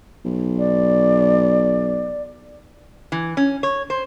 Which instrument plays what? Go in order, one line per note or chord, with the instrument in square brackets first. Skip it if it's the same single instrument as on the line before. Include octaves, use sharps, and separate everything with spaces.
[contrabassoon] B1
[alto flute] D5
[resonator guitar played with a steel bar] E3
C#4
C#5
C5